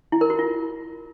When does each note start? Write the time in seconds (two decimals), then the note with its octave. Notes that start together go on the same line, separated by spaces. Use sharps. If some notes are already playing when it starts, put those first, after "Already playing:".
0.12 E4
0.21 A#4
0.30 F#4
0.39 F4